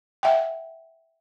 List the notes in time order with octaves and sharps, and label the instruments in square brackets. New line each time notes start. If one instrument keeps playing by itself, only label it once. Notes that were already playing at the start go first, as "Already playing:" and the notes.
[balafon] E5 F#5 G5